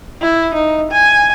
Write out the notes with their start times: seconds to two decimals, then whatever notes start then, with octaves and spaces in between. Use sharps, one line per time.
0.21 E4
0.54 D#4
0.91 G#5